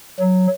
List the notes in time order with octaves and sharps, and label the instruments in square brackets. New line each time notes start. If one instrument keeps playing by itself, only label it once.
[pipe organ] F#3